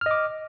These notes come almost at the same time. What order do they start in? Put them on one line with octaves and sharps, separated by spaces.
F6 D#5 D6